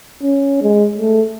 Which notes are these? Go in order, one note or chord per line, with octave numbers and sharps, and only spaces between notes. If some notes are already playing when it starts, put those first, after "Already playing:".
C#4
G#3
A3